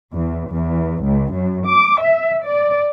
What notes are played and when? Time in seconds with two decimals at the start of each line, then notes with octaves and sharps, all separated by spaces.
0.15 E2
0.52 E2
1.05 C#2
1.37 F#2
1.68 D6
2.04 E5
2.47 D5